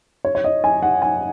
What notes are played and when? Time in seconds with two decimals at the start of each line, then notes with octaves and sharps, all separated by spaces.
0.25 C#5
0.35 C#5
0.44 D#5
0.64 G#5
0.82 F#5
1.02 G#5